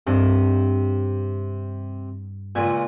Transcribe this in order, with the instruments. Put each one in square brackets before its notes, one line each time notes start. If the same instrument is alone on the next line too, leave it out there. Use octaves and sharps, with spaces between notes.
[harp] G2 [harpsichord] C3
[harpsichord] C#2 A#2 [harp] G#6 D#7